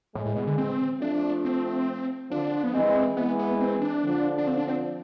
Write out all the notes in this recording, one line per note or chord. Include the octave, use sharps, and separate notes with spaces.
A2 E3 G#3
A2
B2
D3
C4
F3 A3 D4
C4
D3 F3 D4
B3
E3 G#3 C4
E3 G#3 B3
B3
C4
D4
D3 F3
D4
C4
D4
C4